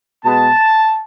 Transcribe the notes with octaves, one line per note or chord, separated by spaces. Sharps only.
B2 G#3 B3 A5